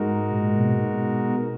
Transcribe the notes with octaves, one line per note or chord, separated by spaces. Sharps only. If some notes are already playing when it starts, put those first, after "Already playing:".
Already playing: G#2 G#3 D#4 F#4 A#4
A#2
B2
B2